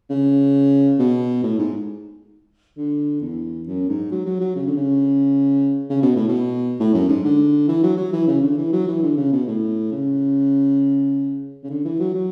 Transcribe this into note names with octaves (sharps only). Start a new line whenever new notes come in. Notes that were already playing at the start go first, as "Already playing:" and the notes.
C#3
B2
A2
G#2
D3
E2
F#2
G#2
F#3
F#3
F#3
C#3
D3
C#3
C#3
B2
A2
B2
A2
F#2
G#2
D3
E3
F#3
F#3
E3
C#3
D3
E3
F#3
E3
D3
C#3
B2
A2
C#3
C#3
D3
E3
F#3
F#3